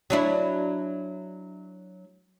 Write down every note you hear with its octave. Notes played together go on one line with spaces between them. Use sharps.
F#3 D4 E4